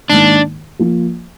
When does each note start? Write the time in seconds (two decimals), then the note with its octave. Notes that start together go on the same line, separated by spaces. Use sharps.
0.10 G#2 D#3 A#3 D4
0.79 F3 A#3 F4